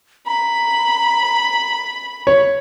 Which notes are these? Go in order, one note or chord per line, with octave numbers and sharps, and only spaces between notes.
A#5 B5
C#5